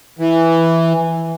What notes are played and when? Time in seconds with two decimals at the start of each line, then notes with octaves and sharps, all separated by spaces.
0.19 E3